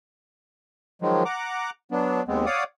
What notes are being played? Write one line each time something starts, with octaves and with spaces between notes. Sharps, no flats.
D#3 F3 F#3 G#3
F#5 A#5 D6
F#3 B3 D4
D#2 G#3 B3 C4
C#5 D5 F5 F#5 D6 D#6